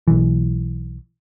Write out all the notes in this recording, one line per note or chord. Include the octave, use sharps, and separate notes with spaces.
B1 E3